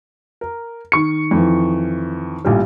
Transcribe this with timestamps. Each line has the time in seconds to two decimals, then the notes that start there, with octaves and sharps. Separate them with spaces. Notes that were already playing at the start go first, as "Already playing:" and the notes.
0.41 A#4
0.92 D#3 C#6 C#7
1.31 F2 E3
2.45 A1 A#2 G3